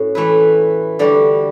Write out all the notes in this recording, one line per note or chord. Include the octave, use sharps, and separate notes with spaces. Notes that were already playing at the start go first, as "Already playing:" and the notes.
Already playing: A2 C#4 F#4
E3 A3 E4 B4
D3 G3 D4 F#4